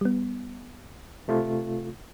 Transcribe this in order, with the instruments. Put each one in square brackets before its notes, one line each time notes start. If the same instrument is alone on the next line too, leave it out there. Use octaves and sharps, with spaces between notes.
[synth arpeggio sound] G3 B3
[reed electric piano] C3 A3 F4